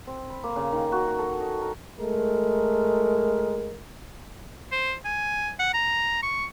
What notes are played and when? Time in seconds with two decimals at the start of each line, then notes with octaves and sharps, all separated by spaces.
0.07 C4
0.30 B5
0.44 A#3
0.56 C#3
0.72 D#3
0.92 F#4
1.07 F#4
1.19 A4
1.40 D#5
1.62 A#4
1.99 G#3 A3 A#4
4.72 C5
5.05 G#5
5.59 F#5
5.74 A#5
6.22 C#6